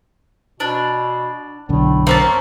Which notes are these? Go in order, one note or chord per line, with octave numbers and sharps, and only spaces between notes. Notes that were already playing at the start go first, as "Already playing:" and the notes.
B2 D4
B1 F#2 A2 D3
A#3 C4 C#4 C5 A5